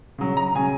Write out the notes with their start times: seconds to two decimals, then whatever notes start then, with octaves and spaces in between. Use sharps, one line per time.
0.18 C#3 F#3
0.37 A#5
0.55 C#3 F#3 G#5